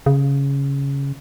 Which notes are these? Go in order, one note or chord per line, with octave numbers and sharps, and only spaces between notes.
C#3